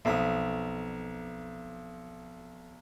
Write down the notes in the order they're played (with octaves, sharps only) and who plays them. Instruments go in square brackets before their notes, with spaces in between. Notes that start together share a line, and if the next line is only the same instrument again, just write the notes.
[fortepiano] B1 [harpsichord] F2 B5 D#6